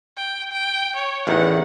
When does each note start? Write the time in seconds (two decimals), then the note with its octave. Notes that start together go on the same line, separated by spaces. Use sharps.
0.17 G5
0.52 G5
0.96 C#5
1.27 A1 E2 D#3 F#5